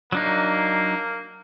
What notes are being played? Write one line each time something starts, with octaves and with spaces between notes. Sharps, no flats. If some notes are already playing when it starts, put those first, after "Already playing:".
F#3 A#3 D4 D#4